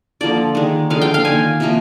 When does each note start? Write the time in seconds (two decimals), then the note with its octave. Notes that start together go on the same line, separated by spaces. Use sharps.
0.21 D3 F3 A#3 D5
0.55 D#3 G#3
0.90 D3 F3 G#3 F5
1.01 G5
1.14 F5
1.25 D#3 A#3 G#5
1.60 C3 F3 A#3